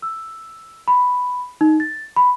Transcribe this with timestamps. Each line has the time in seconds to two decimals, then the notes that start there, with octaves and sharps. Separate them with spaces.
0.02 E6
0.88 B5
1.61 D#4
1.80 A6
2.16 B5